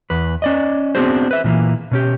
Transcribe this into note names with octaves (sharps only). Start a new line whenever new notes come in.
E2 B4
C#4 D5 D#5
B3 C4 D4 F#4 G#4 C5
B4 E5
A#2 E3 A#3
B2 C#4 G4